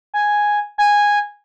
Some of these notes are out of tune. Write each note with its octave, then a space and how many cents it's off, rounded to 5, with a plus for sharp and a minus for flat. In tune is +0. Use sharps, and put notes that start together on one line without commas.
G#5 +0
G#5 -10